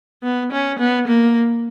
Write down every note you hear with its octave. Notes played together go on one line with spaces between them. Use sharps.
B3
C#4
B3
A#3